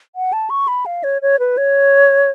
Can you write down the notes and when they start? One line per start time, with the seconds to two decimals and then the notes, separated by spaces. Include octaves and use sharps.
0.16 F#5
0.33 A5
0.50 C#6
0.68 B5
0.86 F5
1.04 C#5
1.22 C#5
1.39 B4
1.57 C#5